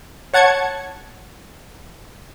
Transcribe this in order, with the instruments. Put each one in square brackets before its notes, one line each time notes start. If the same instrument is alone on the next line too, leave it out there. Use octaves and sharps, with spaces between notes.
[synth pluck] C#5 F#5 A5 G#6 C#7